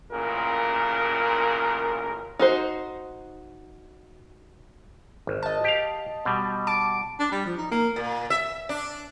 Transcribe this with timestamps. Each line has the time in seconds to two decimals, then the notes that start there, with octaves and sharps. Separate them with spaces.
0.11 A1 A#2 C#3 A#4
2.39 D#4 F#4 C5
5.27 G#1
5.43 D#5 A5
5.64 G4 F5
6.25 B2 G3
6.67 A5 D6 D7
7.20 D4
7.32 G3
7.46 F3
7.58 D#4
7.71 A#3
7.96 A#2
8.30 E5
8.69 D4